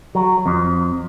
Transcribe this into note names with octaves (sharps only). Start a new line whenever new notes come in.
F#3
F2